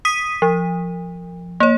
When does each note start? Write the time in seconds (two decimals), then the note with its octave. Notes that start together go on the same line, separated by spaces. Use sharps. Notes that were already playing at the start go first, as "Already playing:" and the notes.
0.05 D#6 B6 D#7
0.42 F3
1.60 A#3 C#5